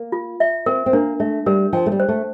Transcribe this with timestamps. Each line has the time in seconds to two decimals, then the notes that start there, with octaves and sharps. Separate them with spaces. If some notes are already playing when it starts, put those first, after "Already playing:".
Already playing: A#3
0.12 F4
0.40 E5
0.66 C4 A#4
0.86 C4
0.93 A#3 D4
1.20 A3 E5
1.46 G3 A#4
1.73 F3 G5
1.86 A3
1.92 G3
2.00 C5
2.08 A3